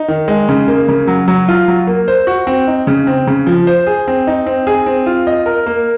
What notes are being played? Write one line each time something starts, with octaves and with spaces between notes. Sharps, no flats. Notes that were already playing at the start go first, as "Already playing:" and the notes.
Already playing: D#4
D#3
G#3
C#3
A#3
C#3
F#3
F#3
F4
F#3
A#3
C5
F#4
C4
D#4
C#3
C4
C#3
F3
C5
G#4
C4
D#4
C4
G#4
C4
F4
D#5
A#4
A#3